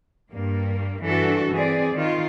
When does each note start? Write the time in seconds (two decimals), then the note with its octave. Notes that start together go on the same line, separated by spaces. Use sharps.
0.30 G2 A#3
1.02 G2 E3 D4 F#4 A4
1.52 E3 C4 G#4 D5
1.95 D#3 F4